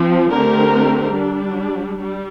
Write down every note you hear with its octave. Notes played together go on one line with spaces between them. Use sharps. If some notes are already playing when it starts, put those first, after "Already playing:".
Already playing: F3 C4
D3 A3 C4 G4 A#4
G3 D4
G3